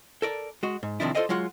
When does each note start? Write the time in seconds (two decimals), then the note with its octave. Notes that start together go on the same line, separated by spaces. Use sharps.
0.22 A4 A#4 D5
0.63 G#3 F#4
0.83 G#2
1.00 D#2 C3 D#3 F3 D4 E4
1.15 F4 A4 C5 D5 D#5 F5
1.29 F#3 G#3 F4 F#4 F#5